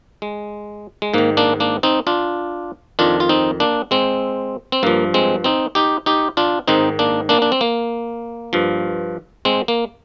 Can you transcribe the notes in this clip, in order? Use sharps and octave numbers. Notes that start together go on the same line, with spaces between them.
G#3
G#3
G#2 D#3 A#3
A#3 D4
A#3 D4
C4 D#4
D4 F4
F2 D#3 D4 F4
F4
C4 D#4
A#3 D4
G#3 C4
C4
G2 F3 A#3
G#3 C4
C4 D#4
D#4 G4
D#4 G4
D4 F4
G#2 D#3 C4 D#4
A#3 D4
A#3 D4
D4
C4
A#3
G2 F3
G#3 C4
A#3